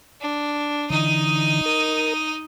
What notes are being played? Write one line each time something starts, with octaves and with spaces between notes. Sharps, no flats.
D4
D3 E3 D#4 D#5
A#4